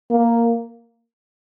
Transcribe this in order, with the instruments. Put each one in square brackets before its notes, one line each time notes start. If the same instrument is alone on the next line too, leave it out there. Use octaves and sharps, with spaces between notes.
[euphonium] A#3